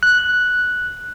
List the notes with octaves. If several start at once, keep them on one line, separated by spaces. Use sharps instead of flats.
F#6